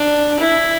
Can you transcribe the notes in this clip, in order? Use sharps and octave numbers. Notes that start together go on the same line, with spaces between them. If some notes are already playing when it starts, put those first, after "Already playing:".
Already playing: D4
E4